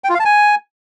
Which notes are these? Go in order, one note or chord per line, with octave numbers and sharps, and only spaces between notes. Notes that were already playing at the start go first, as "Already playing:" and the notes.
G5
F4
F5
A5
G#5